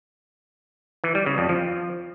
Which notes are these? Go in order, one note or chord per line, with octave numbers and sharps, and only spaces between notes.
E3
G3
C#3
F2
F3